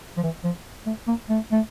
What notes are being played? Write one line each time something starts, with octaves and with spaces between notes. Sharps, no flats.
F3
E3
F3
A3
A#3
A3
A3